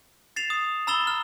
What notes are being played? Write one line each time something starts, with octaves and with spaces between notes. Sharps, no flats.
A6 C7 E7 F7
D#6
A#5 B5 E6 A6 E7 G7
F6